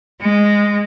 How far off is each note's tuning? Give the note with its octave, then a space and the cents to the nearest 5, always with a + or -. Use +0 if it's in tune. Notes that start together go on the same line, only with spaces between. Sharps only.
G#3 -10